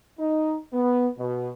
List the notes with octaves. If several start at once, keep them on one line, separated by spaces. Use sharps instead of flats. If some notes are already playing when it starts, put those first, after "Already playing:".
D#4
B3
B2